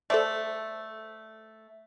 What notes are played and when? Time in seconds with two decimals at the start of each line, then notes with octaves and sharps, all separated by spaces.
0.10 A3 A4 C5 D5